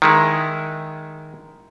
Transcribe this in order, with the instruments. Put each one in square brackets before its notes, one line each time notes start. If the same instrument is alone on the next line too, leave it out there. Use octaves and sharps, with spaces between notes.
[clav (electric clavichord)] D#3 G#3 E4